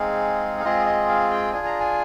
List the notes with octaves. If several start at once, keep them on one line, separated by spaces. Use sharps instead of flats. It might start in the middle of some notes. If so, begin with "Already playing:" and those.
Already playing: G#3 C4 D#4 G#4 F5
F5
G#3 C4 F4 G#4 D#5
D#5
F5
G5
D4 F4 G#4 G#5
A#5
G#5